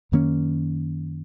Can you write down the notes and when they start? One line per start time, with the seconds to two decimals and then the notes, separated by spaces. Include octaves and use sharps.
0.12 F#2 D#3 A#3 C#4